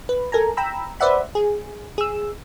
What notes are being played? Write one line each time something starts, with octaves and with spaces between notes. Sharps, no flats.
B4
A4 A#4 G#5 A#5
G5 A#5 B5 E6
B4 C5 D5 E5 F#5 B5
G#4
G#4 E6